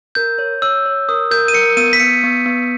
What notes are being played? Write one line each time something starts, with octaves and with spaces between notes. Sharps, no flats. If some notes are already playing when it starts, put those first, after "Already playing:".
A#4 G6
C#5
C#5 E6
C#5
A#4 D#6
A#4 G6
D#7
A#4 C#7
B3 D#7
B6
B3 C#7
B3
B3